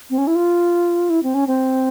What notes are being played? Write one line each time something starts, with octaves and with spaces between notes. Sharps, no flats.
C4
C#4
E4
F4
E4
C4
C#4
C4